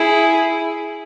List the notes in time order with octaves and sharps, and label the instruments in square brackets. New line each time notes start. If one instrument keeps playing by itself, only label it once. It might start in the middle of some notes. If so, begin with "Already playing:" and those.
Already playing: [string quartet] E4 G#4